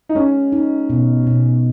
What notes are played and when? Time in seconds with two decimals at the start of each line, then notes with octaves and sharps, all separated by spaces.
0.09 D#4
0.15 G#3 C#4
0.52 D#4
0.90 B2
1.27 B2